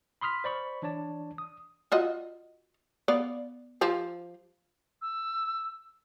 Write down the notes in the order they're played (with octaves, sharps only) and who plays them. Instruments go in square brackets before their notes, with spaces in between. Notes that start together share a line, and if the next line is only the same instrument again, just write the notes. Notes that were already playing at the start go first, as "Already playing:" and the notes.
[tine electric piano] B5 C6 D#6 F6 B6
C5 D5 B5 C#6
E3 D4 C#5 D5 A5
D#6
[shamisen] F4 F#4 D#5
B3 D5 F5
F3 G4 C5
[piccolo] E6